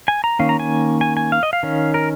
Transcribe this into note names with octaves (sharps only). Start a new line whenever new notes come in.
G#5
A#5
D#3 A#3 C#4 F5
A#5
G#5
G#5
G#5
F5
D#5
F5
D#3 C#4
A#4